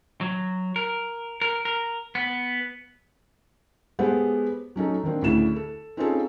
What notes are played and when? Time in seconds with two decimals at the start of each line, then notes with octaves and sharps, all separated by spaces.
0.21 F#3
0.76 A#4
1.41 A#4
1.65 A#4
2.15 B3
3.99 G#3 B3 G4 A4 C5 F#5
4.76 F#3 C#4 D#4 A4
5.03 D#3 A#3 C4 D4
5.22 D2 C#3 E4 E7
5.56 A4
5.97 C4 C#4 D#4 F4 G#4 A4